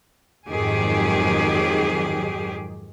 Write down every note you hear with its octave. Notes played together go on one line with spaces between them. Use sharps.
F2 G#2 D#3 F#3 G4 G#4